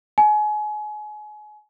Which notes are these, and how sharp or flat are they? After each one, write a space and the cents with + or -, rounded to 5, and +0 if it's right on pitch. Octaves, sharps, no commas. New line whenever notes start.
G#5 +30